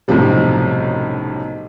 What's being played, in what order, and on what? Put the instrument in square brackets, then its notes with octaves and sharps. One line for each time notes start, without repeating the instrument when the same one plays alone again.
[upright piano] B1 F#2 A2 C3 F3 G3